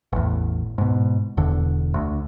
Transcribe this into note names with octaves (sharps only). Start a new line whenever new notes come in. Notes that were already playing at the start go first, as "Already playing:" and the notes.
A1 E2
G#2 B2
E1 E2 D3
D2